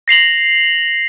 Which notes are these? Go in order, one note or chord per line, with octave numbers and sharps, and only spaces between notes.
A#6 C7 F7 F#7